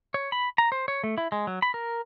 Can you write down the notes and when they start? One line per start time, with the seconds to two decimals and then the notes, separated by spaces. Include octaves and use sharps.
0.14 C#5
0.32 B5
0.58 A#5
0.72 C5
0.88 C#5
1.04 A3
1.18 E4
1.32 G#3
1.47 F#3
1.62 B5
1.74 A#4